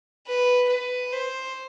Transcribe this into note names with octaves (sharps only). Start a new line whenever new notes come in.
B4
B4
C5